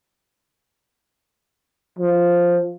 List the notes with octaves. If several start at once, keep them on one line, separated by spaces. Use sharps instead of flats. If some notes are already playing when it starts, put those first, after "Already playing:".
F3